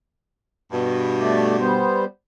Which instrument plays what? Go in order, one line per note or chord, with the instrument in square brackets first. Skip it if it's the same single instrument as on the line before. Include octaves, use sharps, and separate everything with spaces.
[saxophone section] G2 B2
[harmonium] A3 D5
G3 B3 C5